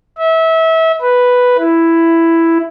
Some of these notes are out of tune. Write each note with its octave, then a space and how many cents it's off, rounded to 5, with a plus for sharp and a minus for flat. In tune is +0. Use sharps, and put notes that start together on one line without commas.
E5 -25
B4 +0
E4 +5